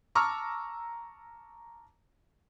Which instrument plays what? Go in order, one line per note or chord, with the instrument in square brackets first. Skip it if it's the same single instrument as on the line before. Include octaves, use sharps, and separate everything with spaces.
[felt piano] A5 A#5 C#6 D6 E6 F6